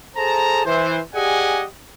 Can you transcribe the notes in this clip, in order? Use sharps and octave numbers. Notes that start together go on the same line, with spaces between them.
G#4 A4 C5 A5 A#5
E3 C5
G4 G#4 D5 D#5 F#5 G#5